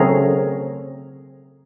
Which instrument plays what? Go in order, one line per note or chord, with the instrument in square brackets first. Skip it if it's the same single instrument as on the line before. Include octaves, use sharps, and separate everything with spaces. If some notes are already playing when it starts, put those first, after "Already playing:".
Already playing: [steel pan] C#3 F#3 A3 C4 G#4 A#4